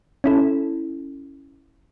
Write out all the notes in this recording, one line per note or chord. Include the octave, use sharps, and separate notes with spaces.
C#4 E4 A4